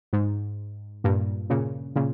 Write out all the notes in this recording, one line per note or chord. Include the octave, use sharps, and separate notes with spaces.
G#2
G2 A#2
A#2 C#3
A#2 C#3